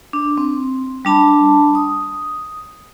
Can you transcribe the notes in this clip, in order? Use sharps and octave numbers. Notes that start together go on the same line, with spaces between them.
D4
C4
G3 D4 A5 B5
D#6